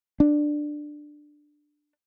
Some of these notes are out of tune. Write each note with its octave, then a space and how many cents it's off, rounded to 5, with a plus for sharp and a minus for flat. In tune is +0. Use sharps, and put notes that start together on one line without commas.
D4 +10